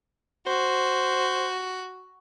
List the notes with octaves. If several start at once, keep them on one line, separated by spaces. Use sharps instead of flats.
F#4 C5